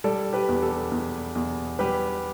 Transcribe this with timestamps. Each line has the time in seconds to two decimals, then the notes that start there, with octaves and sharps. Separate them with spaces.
0.04 G3 A4 D5
0.33 G4 B4
0.49 E2
0.62 A4
0.92 E2
1.35 E2
1.79 G3 G4 B4